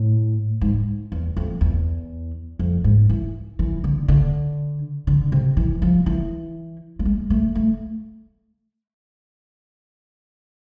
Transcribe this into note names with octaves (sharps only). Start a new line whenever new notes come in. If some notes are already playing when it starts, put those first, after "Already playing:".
Already playing: A2
G#2
E2
F2
E2
F2
G#2
E3
E3
D3
D3
D3
C3
E3
F3
E3
A3
G#3
A3
A3